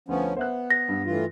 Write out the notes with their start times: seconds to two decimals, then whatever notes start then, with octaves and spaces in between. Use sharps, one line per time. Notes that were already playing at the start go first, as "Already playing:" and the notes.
0.09 D2 F3 B3 C#4
0.37 B3 C5 E5 F#6
0.70 A#6
0.88 G2
1.06 A2 E3 F4